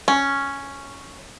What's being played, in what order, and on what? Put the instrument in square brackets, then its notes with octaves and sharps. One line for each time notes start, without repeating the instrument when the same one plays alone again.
[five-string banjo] C#4